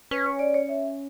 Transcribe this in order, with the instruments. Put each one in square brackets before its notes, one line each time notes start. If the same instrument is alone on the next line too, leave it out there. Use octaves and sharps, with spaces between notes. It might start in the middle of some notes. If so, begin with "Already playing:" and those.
[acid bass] C#4 [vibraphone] B4
[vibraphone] C#5
D5
C#5
E5